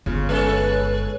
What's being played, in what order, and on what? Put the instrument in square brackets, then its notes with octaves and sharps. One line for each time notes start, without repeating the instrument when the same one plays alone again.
[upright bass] G1 [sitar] C#3 F4
[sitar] G#3 C#4 A4 [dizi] B4